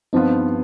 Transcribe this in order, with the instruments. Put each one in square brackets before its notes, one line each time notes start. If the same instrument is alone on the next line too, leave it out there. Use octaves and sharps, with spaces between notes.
[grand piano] G2 F3 B3 F4 [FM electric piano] C4 D#4